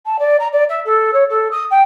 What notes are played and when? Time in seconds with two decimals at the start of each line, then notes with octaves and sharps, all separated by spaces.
0.06 A5
0.19 D5
0.40 A#5
0.53 D5
0.70 E5
0.85 A4
1.13 C#5
1.30 A4
1.52 D#6
1.71 G5